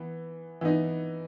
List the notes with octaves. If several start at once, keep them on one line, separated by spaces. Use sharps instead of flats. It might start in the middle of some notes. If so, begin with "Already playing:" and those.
Already playing: E3 B3
E3 B3 D#4